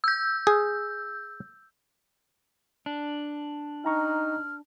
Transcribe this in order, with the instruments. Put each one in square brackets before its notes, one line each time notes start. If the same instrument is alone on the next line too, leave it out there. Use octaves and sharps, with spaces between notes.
[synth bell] E6 G6
[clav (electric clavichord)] G#4
[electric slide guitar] D4
[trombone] D#4 [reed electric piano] G5 A#5 C#6 [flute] F6